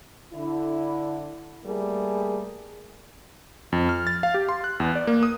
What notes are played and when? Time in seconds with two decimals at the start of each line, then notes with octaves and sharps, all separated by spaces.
0.33 D3 E4
1.65 G3 A3 A#3 G#4
3.72 F2
3.89 F6
4.07 A6
4.23 F5
4.34 G4
4.49 C6
4.64 F#6
4.80 E2
4.95 D5
5.07 A#3
5.23 D#6